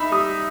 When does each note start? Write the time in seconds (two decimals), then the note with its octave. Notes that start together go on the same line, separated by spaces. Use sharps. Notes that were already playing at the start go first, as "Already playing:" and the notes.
Already playing: D#4 E5 B5
0.12 G3 D#6